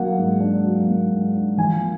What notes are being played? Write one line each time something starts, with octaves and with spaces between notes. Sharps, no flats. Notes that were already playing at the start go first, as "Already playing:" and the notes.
Already playing: F#3 A#3 F#5
G#2
D4
F#3
A#3
G#2
D4
F3 G#5
A#3